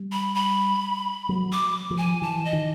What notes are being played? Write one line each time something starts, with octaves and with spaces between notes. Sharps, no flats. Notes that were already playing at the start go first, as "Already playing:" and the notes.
Already playing: G3
B5
B5
F#3
D6
F3
G#5
E3 A5
D#5
D#3